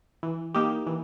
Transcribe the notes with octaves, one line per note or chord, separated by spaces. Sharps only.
E3
A#3 D#4 G4
E3